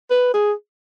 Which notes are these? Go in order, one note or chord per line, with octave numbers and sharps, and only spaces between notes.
B4
G#4